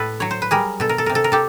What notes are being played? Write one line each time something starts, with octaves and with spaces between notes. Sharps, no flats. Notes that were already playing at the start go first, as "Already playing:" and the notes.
Already playing: A2 A4 B4
F#3 C#5
C5
B4
G3 G#4 A#4
B2 A4
A#4
A4
C3 A#4
A4
A#4
G4 A4